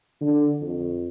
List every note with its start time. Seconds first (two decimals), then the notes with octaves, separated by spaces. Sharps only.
0.21 D3
0.61 F2